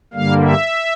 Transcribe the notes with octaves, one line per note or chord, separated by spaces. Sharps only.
G2 D3 G3 A#3 F5
E5